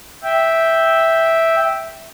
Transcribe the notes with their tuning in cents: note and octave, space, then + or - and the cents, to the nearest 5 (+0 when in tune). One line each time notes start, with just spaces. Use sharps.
E5 -5 G5 +0